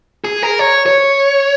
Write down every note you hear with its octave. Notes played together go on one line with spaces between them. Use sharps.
G#4
A#4
C#5
C#5